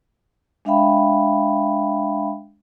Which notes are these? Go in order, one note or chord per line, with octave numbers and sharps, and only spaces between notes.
G#3 D4 E5 F5 G5 B5